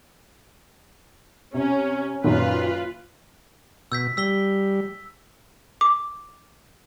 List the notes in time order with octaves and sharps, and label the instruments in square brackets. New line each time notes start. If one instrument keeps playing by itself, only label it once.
[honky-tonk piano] C3 [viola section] C#4
[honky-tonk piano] F#2 A#2 D#3 [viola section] F4 B4
[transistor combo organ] B2 [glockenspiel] E6 G6 B6
[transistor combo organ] G3 [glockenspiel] E6 B6 G7
[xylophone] D6